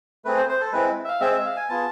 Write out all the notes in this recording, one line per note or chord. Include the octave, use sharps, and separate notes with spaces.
A3 C4 G#4 B4
C5
C5
A4
G#3 C4 E4 B4
E5
F5
G#3 C4 G#4 E5
E5
F5
G#5
B3 F4 G#4 A5